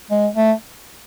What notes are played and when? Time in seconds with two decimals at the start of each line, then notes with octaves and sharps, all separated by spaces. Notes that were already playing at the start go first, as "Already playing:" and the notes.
0.11 G#3
0.35 A3